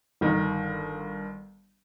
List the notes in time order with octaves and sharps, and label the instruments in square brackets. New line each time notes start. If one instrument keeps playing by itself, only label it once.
[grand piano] G1 D#3